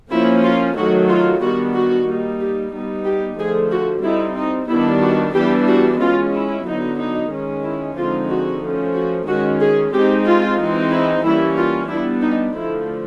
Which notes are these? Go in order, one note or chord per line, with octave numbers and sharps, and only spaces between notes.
F3 A#3 C#4 E4
F4
D#3 F#3 A3 F#4
F4
D#3 G3 B3 D4 F#4
F#4
G3 A#3 D#4
G4
G3 B3 D#4
G4
D3 F3 A3 G#4
F#4
G3 C4 D#4 E4
D#4
D#3 G3 B3 D4 E4
F#4
E3 G3 B3 D4 G4
F#4
G#3 C#4 F4
E4
D3 F#3 B3 D#4
D#4
D#3 G#3 C#4
E4
D3 F3 G#3 C4 D#4 F4
F#4
F3 A3 C#4
F#4
D#3 G#3 C#4 F#4
G#4
G#3 C4 D#4 G4
F4
E3 G#3 C4 D#4
E4
E3 G3 A#3 C#4 E4
F4
G3 B3 D4 E4
D#4
D3 F3 A3 E4